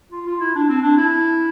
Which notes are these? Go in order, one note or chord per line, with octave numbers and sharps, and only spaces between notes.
F4
F4
E4
D4
C4
D4
E4